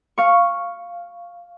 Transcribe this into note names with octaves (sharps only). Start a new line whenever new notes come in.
F5 C#6